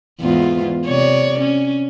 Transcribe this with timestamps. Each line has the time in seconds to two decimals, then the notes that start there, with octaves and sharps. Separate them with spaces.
0.21 E2 G#2 F4
0.86 C3 C#5 D5
1.40 C#4